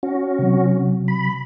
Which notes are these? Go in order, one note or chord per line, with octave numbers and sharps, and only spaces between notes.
C#4 F#4
C3 F#3
B5